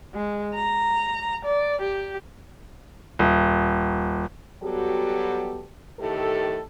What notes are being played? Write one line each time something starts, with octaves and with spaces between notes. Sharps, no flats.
G#3
A#5
D5
G4
D#1
F#3 G3 B3 F#4 G4 A4
A2 D#3 G4 A4